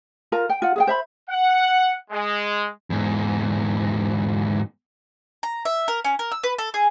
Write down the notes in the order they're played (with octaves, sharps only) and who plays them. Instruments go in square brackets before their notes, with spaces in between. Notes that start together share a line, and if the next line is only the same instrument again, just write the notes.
[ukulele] F4 A#4 A#5
G5
F4 F#5
G#4 F5 G5
C5 E5 B5
[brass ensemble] F#5
G#3
[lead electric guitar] E2 G#2
[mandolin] A#5
E5
A#4
C#4
A#4
E6
B4
A4
G#4